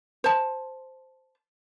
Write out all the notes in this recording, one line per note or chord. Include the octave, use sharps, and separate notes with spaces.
C5 A5